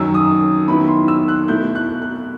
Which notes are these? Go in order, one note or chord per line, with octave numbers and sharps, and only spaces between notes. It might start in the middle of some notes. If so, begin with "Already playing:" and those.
Already playing: F#2 D#3 F#3 E6
D#6
D#3 F#3 B3 E4 B5
C6
E6
F#6
B2 A3 E4 G6
F#6
F#6